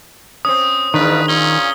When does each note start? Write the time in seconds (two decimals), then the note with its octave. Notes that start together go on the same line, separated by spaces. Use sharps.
0.45 C4 C#4 D#6
0.94 E2 G#2 D#3 D4 B4
1.28 A#2 C#4 G7